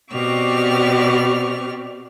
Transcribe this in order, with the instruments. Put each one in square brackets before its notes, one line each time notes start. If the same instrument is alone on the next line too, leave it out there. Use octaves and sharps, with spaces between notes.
[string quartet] B2 C4 G4 D5 C#6 F6